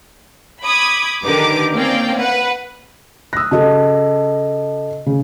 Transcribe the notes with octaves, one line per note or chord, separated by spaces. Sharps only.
B5 D6 D#6 G#6
D3 D#3 G4 A#4 B4 D6
A#3 C4 C#4 D5 F5 G5
B4 F#5
D#6 E6 F#6 A#6
C#3 F#4 G4 A4 D#5 A5
C#3